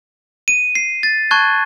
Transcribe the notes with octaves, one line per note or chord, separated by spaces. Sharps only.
D#7
C7
A6
A5 C#6 F#6 G#6